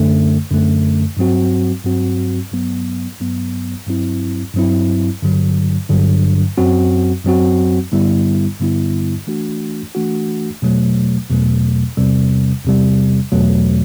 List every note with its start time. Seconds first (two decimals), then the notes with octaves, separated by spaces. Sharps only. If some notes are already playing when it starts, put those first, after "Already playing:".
Already playing: F#2 D3 A3
0.50 F#2 D3 A3
1.17 G2 F#3 C4 F#4
1.85 G2 F#3 C4 F#4
2.52 G2 F#3 B3
3.20 G2 F#3 B3
3.87 G2 F#3 C4 E4
4.54 G2 F#3 C4 E4
5.22 G2 D3 F#3
5.89 G2 D3 F#3
6.57 F#2 F#3 C4 F#4
7.24 F#2 F#3 C4 F#4
7.92 G2 D3 G3 B3 E4
8.60 G2 D3 G3 B3 E4
9.27 E3 A3 D4 F#4
9.95 E3 A3 D4 F#4
10.62 E2 B2 F#3 A3
11.30 E2 B2 F#3 A3
11.97 E2 C3 G3
12.65 E2 C3 G3
13.32 E2 B2 F#3 A3